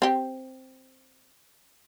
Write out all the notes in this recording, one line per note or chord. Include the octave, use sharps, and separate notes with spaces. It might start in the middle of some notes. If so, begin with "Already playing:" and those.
C4 G4